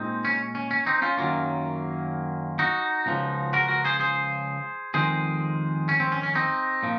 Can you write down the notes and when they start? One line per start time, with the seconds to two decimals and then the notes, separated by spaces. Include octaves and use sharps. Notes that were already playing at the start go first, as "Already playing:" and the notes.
Already playing: A#2 G#3 C4 D#4
0.25 C#4
0.55 C#4
0.71 C#4
0.86 C4 D#4
1.02 C#4 F4
1.17 F#2 D#3 F#3 A#3 C#4 F4
2.59 D#4 F#4
3.06 C#2 C#3 F3
3.53 F#4 A#4
3.68 F#4 A#4
3.85 G#4 C5
4.00 G#4 C5
4.94 F2 D#3 G#3 G#4 C5
5.89 C#4
6.00 C4
6.12 C#4
6.23 C#4
6.35 C4 D#4
6.83 A#2 F3